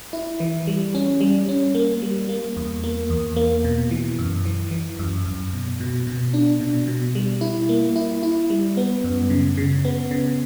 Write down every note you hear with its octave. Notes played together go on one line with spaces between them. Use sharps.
E4
E3
G3
C#4
G3
C#4
A#3
G3
A#3
E2
A#3
E2
A#3
B2
E3
F#2
E3
E3
F#2
F#2
B2
B2
B2
D4
B2
B2
G3
E4
A#3
E4
E4
G3
B3
F#2
C#3
C#3
B3
C#3